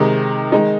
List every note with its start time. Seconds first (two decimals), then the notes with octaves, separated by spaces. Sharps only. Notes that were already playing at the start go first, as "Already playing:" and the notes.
Already playing: C3 D#3 G#3 D#4
0.52 D#3 G#3 D#4